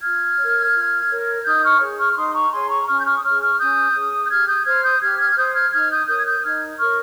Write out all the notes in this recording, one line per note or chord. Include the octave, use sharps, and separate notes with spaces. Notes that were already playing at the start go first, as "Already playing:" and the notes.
F4 F6 G#6
A#4 C#5
F4
A#4 C#5
D#4 D#6 G6
C#6 F6
G#4 C#5
C#6 F6
C#6
D#4 C6 D#6
A#5 C#6
G#4 C#5 G#5 C6
A#5 C#6
C#4 C#6 F6
G6
C#6 F6
D#6
G#4 C#5 C#6 F6
C#6 F6
C#4 D#6 G6
G#4 C#5
G6
G4 F6 G#6
D#6 G6
C5 F6 G#6
D#6 G6
G4 F6 G#6
F6 G#6
F6
C5 D#6 G6
F6 G#6
D#4 F6 G#6
D#6 G6
A#4 C#5 D#6 G6
G#6
D#6 G6
D#4 F6 G#6
A#4 C#5 C#6 F6